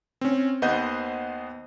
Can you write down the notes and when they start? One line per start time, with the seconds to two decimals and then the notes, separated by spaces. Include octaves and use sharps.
0.21 C4 C#4
0.62 D#2 B3 C5 D#5 F#5 G6